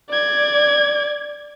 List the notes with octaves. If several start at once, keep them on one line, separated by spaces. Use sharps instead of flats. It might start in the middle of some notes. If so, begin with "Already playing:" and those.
D5 G#6